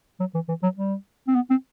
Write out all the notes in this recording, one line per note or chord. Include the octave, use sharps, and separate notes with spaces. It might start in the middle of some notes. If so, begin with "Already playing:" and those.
F#3
E3
E3
F#3
G3
C4
B3
C4